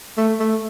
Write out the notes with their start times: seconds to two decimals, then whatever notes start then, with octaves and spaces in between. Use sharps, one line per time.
0.17 A3
0.40 A3